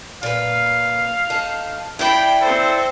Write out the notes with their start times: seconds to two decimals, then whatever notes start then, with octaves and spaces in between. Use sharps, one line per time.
0.23 A#2 B4 F5
1.30 D#4 A4
1.99 E4 F4 D5 G5 B5
2.42 C4 A4 C5